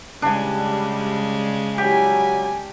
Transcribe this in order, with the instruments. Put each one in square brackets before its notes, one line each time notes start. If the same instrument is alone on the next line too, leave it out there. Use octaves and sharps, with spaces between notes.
[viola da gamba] C#3 G#3 [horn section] G3 [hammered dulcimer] D4 G#5
[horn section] F#3 G3 [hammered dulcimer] G4 [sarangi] G#5